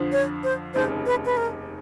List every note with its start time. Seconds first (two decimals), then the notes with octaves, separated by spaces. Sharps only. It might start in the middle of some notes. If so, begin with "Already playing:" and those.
Already playing: F2 D3 F3
0.12 C#5
0.44 C5
0.74 F1 D#2 C#3 C5
1.06 B4
1.25 B4
1.37 A#4